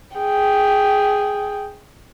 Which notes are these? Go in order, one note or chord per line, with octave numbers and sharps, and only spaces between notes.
G#4 G5